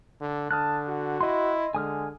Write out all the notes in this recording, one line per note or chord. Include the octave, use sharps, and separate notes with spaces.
D3
D3 A5 D#6 F6 F#6
F#4
E4 D#5 C6
D3 G#3 G#5 D#6 F6